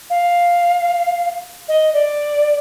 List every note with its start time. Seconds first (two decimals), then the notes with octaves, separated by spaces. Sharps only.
0.10 F5
1.68 D#5
1.94 D5